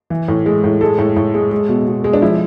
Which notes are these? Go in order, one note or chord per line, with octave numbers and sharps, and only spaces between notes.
E3
A2
G#3
A2
G#3 A4
A2
A2
G#3
G#3
B2
B2
G#3
D4
F3 E4